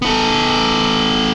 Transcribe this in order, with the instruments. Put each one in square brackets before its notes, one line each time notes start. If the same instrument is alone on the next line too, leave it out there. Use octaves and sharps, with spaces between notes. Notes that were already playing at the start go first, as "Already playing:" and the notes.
[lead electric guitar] B3 A4